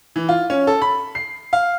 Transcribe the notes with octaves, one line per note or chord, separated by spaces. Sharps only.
E3
F4
C#4
A4
B5
C7
F5